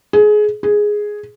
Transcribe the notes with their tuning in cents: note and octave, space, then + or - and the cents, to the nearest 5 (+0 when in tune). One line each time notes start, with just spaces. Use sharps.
G#4 +20
G#4 +0